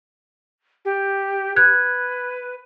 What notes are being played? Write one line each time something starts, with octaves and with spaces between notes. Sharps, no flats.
G4
B4 F#6 G#6